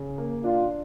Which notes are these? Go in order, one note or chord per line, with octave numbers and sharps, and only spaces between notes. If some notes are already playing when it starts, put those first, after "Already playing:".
Already playing: C#3
A#3
D4 F4